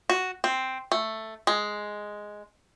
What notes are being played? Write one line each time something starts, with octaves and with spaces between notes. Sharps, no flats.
F#4
C4
A3
G#3